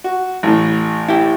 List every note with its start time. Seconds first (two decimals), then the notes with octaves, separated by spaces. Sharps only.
0.04 F#4
0.43 A1 A2
1.08 E4 G4